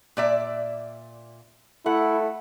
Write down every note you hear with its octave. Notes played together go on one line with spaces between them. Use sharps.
A#2 D5 E5
A3 E4 F#5